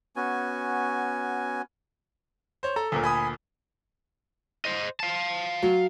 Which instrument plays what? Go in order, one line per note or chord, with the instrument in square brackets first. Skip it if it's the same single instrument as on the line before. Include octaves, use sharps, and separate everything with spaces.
[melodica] B3 C#4 F#4 G#5
[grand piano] C5 C#5
[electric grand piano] A4 [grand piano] A#5
[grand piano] D2 A#2 A#4
[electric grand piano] G#5 B5 D#6
[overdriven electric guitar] C5 D#5
F5 A5
[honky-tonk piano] F#3